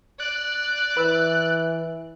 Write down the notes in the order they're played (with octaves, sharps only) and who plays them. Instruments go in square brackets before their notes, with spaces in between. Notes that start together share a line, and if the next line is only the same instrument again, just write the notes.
[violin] D5 [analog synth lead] F#6
[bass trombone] E3 [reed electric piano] B4 E6